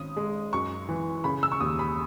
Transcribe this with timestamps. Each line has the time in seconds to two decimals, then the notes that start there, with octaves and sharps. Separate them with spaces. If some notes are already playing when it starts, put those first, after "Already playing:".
Already playing: G#1 C#4 D#6
0.16 G#3
0.53 F#2 C#6
0.89 E3
1.24 C#3 B5
1.43 E6
1.52 C#6
1.60 D#2 D#6
1.79 B5